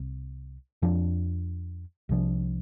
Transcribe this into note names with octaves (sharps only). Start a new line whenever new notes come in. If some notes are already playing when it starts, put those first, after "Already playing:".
Already playing: C2 C3
F2 F3 D4
C2 C3 F3 D4